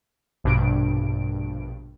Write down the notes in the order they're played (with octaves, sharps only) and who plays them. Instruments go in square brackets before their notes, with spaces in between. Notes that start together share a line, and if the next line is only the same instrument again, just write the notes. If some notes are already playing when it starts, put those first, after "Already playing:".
[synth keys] A#1 G2 B2 D4 D7